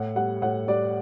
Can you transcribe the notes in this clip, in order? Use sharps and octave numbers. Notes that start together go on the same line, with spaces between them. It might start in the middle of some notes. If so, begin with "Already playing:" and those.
Already playing: A2 F#5
G3 F#5
A2 F#5
G3 D5